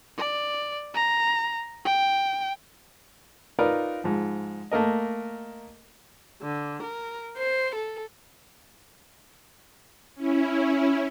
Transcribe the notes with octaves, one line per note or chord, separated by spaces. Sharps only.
D5
A#5
G5
D#4 F4 A#4 B4 D5
G#2 F3
A3 A#3 A#4 D#5
D3
A#4
C5
A4
C#4 E4